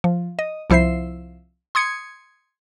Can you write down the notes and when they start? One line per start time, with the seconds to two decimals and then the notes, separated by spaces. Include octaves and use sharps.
0.04 F3
0.39 D#5
0.70 C2 F3 E4 C5 E5 C7
1.75 C6 D#6 G#6 C#7